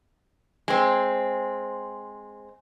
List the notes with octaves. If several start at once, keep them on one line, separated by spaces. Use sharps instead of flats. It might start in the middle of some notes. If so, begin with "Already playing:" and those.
G#3 C4